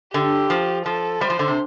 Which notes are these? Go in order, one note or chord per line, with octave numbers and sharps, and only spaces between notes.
D3 G4
F3
F3 A4
G3 C5
F3
D3
C3